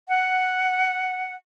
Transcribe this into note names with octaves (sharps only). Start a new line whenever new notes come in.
F#5